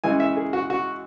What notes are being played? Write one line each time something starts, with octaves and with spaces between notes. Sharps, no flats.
C#3 E3 G#3 G#5
E5
G#4
F#4
F#4